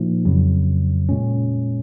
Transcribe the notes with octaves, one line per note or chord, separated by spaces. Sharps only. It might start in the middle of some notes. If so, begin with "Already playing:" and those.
Already playing: A#2 F3 A#3 D#4
F2 C#3 F#3
A#2 G#3 C#4